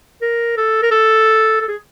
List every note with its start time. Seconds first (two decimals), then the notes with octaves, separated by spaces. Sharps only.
0.22 A#4
0.57 A4
0.82 A#4
0.91 A4
1.61 A4
1.68 G#4